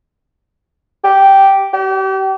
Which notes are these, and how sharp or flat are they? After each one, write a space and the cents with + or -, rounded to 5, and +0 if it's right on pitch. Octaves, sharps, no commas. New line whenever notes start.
G4 -5
G4 -35